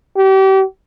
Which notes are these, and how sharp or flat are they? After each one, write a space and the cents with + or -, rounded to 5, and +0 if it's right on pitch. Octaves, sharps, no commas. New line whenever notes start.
G4 -35